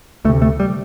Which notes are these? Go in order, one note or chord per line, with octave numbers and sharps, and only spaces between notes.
D2 C3 A3
A3
G3